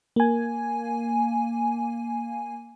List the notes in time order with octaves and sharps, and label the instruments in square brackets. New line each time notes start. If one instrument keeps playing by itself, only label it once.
[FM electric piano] A#3 G#5